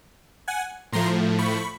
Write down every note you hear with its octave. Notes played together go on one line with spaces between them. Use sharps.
F#5 G#5
A2 F3 A3 A#5 C6
B5 C#6